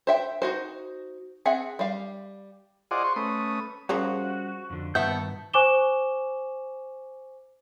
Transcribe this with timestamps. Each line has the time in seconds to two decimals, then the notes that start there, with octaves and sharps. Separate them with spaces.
0.07 C5 E5 G5
0.42 D#4 F#4 C5
1.46 C4 G#4 E5 F#5
1.79 G3 F5
2.91 F4 G#4 C5 D5 D#5 F#5
3.04 C5 C6 C#6
3.16 A3 C#4 B4 D#6
3.89 C#3 F3 G3 A#3 C#4 F#4
4.70 F2 D3
4.95 G2 A#2 D#3 B3 E5 A5 C#6 G6
5.54 C5 G#5 C#6 D6 E7 G7